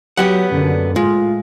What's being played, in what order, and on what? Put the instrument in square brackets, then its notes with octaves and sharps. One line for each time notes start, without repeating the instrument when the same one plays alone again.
[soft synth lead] F#3 [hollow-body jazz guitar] B3 G4 F#5
[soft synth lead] F#2 [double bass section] D3 A#3
[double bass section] A2 [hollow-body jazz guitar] G#3 [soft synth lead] F4